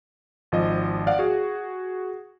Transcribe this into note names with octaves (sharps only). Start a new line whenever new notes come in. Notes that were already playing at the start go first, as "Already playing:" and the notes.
G#1 F3 D#5
D5 F5 F#5
F#4 G#4